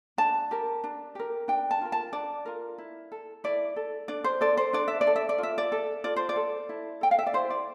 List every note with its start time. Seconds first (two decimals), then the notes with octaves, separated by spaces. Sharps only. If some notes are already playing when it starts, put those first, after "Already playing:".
0.18 D4 A5
0.51 G4 A#4
0.84 D4
1.15 G4 A#4
1.48 D4 G5
1.71 A5
1.81 F4 A#4
1.92 A5
2.13 D4 D5
2.46 F4 A#4
2.78 E4
3.12 A4
3.44 E4 D5
3.76 A4
4.08 D4 D5
4.24 C5
4.41 A4 D5
4.57 C5
4.73 D4 D5
4.88 E5
5.01 D5
5.07 A4
5.16 E5
5.29 D5
5.38 F4 E5
5.58 D5
5.72 A4
6.04 F4 D5
6.16 C5
6.29 D5
6.36 A4
6.69 E4
7.01 A4 G5
7.11 F5
7.19 E5
7.27 D5
7.33 E4 C5
7.50 D5